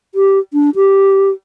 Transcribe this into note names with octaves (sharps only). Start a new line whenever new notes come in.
G4
D4
G4